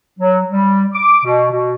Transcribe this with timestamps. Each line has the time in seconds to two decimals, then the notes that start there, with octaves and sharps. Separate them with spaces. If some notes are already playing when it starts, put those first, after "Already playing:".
0.19 F#3
0.50 G3
0.93 D6
1.24 B2
1.51 B2